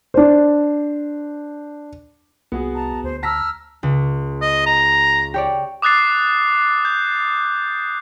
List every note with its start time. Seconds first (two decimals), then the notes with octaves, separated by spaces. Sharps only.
0.14 D4 C5
2.52 C2 B3 F#4 G#4
2.74 A5 A#5
3.03 D2 C5
3.23 A5 A#5 E6 F6 A#6 B6
3.83 C#2
4.42 D#5
4.66 A#5
5.34 G4 C#5 D5
5.82 D6 D#6 F#6 A6 C7
6.85 G6